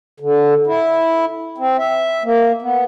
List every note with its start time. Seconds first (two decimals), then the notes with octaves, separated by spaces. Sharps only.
0.20 D3
0.67 E4
1.58 C4
1.79 E5
2.24 A#3
2.62 B3